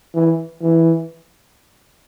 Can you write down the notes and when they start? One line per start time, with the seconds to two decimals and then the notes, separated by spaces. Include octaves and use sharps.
0.14 E3
0.61 E3